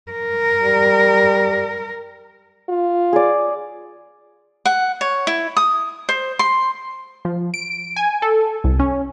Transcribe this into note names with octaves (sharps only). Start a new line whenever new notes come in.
A#4
G3
F4
G#4 D5
F#5
C#5
E4
D#6
C5
C6
F3
D7
G#5
A4
C2
C#4